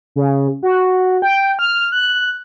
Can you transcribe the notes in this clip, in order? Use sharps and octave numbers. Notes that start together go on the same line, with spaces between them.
C#3
F#4
G5
F6
F#6